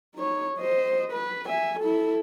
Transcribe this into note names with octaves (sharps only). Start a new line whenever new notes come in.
D#4 C#5
C5 D#5
B4
E5 G#5
E4 A4